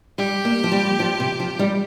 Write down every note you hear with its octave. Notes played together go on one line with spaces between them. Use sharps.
G3 G4
A#3
F3
G3
F3
C3
F3
G3